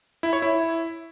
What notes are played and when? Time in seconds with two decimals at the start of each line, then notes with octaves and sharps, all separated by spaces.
0.23 E4
0.33 C#5
0.42 E4